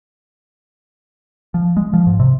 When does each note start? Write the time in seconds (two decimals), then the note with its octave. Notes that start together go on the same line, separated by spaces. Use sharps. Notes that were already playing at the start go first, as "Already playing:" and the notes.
1.54 F3
1.77 G#3
1.93 F3
2.07 G#2
2.20 C3